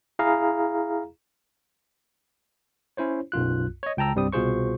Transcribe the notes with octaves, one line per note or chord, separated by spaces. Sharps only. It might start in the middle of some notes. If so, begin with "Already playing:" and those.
E4 G#4 F5 A#5
C#4 E4 C5 C#5
B1 F#2 F4 F#6
C#5 D#5
C#2 G5 A5 A#5 E6
C2 G2 G3 C4 D#6
C2 B2 F4 G#4 C5 C#6